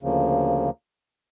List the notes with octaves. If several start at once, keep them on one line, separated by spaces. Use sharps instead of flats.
D2 C#3 F3 A#3